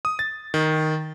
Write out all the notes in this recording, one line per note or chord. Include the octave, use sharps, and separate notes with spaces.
D#6
A6
D#3